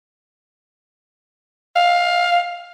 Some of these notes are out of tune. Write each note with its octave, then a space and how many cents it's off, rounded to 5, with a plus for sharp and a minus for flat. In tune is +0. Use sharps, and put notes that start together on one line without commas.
F5 +15